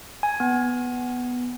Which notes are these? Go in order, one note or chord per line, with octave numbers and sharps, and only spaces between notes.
G#5
B3